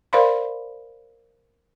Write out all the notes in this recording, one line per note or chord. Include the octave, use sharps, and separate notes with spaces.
A#4 C5 D5 F5 B5 C6